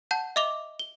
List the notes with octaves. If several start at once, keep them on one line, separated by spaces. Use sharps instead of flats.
F#5 A5 G6
D#5 E5 D6 F7 G7
G7